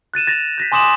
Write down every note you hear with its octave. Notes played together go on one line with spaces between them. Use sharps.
F#6 A6 D#7 E7
A6 A#6 E7 F7
G6 A#6 B6
G#5 C6 D6 D#6 E7 F#7